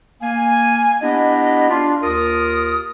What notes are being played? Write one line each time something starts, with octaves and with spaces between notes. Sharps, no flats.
A#3 F5 G#5
B3 D4 E4 G4 D#5
D4 F4
D#2 F4 A#4 D#6